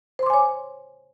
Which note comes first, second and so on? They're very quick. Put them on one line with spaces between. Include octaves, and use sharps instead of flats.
C5 C6 D6 G#5 C#5